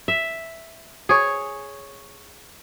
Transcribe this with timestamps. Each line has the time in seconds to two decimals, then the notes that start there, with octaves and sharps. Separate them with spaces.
0.08 E5
1.09 G#4 C#5